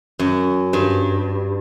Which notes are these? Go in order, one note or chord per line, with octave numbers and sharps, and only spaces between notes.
F#2
G2